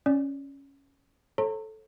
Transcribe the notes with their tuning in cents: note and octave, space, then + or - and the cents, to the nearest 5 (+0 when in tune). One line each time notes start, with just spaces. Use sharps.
C#4 +0 D5 +0
A4 -10 C#5 -40 A#5 -35